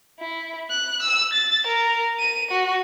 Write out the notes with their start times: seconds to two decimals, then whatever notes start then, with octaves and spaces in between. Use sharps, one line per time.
0.19 E4
0.71 F#6
1.02 E6
1.33 A6
1.67 A#4
2.19 D#7
2.51 F#4